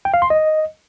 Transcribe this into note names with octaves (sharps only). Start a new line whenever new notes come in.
G5
F5
C6
D#5